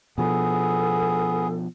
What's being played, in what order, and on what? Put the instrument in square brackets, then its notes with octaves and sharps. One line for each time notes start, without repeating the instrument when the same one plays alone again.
[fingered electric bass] B2 F3 [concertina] B3 G#4 [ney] A4